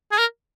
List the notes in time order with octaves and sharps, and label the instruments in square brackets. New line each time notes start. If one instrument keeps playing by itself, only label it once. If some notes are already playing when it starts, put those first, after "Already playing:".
[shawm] G#4
A#4